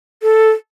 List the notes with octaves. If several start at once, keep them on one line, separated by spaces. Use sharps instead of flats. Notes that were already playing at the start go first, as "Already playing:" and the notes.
A4